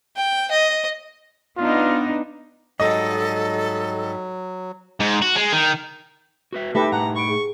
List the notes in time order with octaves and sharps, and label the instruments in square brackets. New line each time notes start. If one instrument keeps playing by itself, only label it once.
[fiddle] G5
D#5
[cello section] B3 D4 D#4 [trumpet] F4
[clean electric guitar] G#2 G3 [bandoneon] F#3 [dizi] A4 [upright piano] D#5
[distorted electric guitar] G#2
F#4
G#3
D#3
[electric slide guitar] F#4 B4 E5
[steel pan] A3 G4 B4 [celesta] D#4 B5 A#6 [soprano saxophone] A4 [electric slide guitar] E5
[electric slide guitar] A2 D#4 [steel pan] F#5 [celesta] A5 [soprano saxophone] A#5
[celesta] B5 D7 [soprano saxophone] C#6
[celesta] G#4